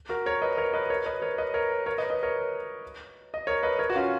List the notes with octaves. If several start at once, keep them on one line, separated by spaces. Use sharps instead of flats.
F#4 A#4
A#4 C#5
B4 D#5
A#4 C#5
B4 D#5
A#4 C#5
B4 D#5
A#4 C#5
B4 D#5
A#4 C#5
A#4 C#5
B4 D#5
B4 D#5
A#4 C#5
D#5
A#4 C#5
B4 D#5
A#4 C#5
F#4
C#4 F4